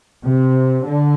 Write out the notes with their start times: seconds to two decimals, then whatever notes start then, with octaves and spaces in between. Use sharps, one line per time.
0.23 C3
0.83 D3